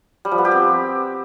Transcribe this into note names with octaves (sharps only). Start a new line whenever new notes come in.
G3
F3
B3
G4
C4